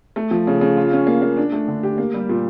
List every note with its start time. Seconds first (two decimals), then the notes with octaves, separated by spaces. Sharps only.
0.16 A3
0.31 F3
0.47 C#3
0.61 C#3
0.77 F4
0.92 C#4
1.07 A#3
1.22 A#3
1.37 D4
1.52 A3
1.68 D3
1.83 G4
1.98 A#3
2.14 G3
2.29 A#2